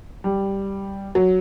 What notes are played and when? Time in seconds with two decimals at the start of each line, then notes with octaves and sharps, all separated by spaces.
0.24 G3
1.15 F#3